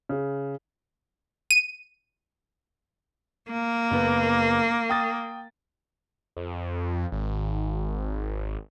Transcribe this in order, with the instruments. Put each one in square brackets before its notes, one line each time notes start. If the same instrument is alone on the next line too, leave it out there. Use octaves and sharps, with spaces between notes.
[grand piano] C#3
[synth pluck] D#7
[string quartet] A#3
[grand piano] F#1 B3
G5 D#6 A6
[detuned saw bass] F2
G#1